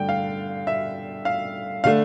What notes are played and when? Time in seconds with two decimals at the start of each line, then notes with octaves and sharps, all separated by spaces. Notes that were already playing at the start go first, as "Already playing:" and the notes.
Already playing: G2 D3 A3 G5
0.09 F5
0.67 E5
1.25 F5
1.84 D3 A3 F5